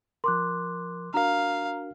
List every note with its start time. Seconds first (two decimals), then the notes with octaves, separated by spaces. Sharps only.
0.24 F3 A#4 C6 D6 F#6
1.14 D4 F#4 A#4 F5 A#5